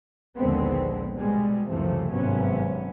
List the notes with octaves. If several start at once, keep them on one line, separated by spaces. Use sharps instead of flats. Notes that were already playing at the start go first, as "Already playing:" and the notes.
A#1 D#2 D3 G#3 B3 C4
B2 G3 G#3
C#2 F#2 C3 E3 F3 A3
G#1 G2 C3 F#3 B3 C#4